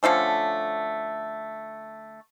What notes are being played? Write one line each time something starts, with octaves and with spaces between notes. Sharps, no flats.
D3 F3 A3 C#4